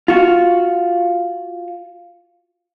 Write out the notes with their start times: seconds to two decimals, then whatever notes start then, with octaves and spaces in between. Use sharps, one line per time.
0.08 F4 F#4